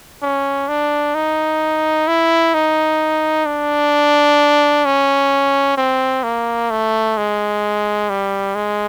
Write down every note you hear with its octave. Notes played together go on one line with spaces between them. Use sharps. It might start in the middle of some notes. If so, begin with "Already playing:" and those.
C#4
D4
D#4
E4
D#4
D4
C#4
C4
A#3
A3
G#3
G3
G#3